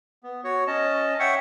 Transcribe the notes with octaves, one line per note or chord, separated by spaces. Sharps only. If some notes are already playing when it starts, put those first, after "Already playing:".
B3
F#4 C#5
C#4 D#5 A5
C#5 E5 F#5 G5 C#6